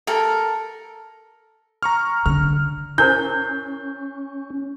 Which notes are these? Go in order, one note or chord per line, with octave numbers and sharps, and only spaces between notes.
A4 A#4
A#5 C#6 F6
D3 F6
C#4 E4 A#4 C5 G6